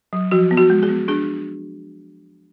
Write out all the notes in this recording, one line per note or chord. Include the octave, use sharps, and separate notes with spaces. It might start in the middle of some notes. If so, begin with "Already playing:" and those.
F#3
F3 F#4
B3
F#4
G#3
G#4
B3
D4 G#4